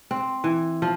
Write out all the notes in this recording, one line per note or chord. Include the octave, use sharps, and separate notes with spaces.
C4
E3
F3